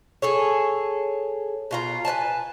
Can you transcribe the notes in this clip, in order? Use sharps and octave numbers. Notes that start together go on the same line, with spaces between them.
G#4 A4 C#5
B2 F4 A#5
B4 D5 G#5 A5